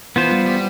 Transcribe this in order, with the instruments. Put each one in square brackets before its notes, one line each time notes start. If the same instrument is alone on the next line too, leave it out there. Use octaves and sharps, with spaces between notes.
[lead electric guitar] E3 [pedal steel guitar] B3 F4 C5
[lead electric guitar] G3
G3